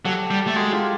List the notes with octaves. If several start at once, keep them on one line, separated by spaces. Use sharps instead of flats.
F#3 G4 A4
G3
A3
G#3 F#4 G#4
F4 G4